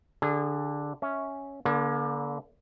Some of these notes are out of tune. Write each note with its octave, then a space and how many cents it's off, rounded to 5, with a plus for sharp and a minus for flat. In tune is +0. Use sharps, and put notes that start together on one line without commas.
D3 +0 G#4 -25
C#4 +0 E5 -20
D3 -25 A#3 +35